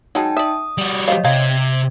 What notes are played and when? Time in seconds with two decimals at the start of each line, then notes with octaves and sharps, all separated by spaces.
0.15 F#3 G#3 D#4 G5 A5
0.37 D5 E5 D#6
0.78 G3 F#4
1.08 G4 C5 C#5 D#5 F5
1.24 C3 C4 D#4 F5 G#6